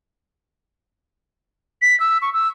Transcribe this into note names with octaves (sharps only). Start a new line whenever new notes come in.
B6
E6
C#6
E6